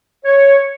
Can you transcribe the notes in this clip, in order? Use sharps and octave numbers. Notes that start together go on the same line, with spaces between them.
C#5